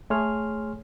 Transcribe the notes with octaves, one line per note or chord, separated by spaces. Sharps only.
A3 G#4 C#5 C6 F6